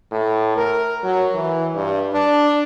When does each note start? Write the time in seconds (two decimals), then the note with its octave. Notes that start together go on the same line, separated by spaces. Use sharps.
0.12 A2
0.57 A#4
1.04 F#3
1.35 E3
1.75 G2
2.13 D4